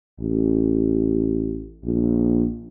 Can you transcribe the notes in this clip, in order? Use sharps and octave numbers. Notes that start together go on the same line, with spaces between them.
A1
A#1